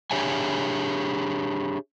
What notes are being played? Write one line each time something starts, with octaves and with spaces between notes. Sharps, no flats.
D4 G4 G#4 C#5 E5 G#5